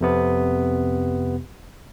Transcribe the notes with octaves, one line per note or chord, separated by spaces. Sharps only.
F2 C3 B3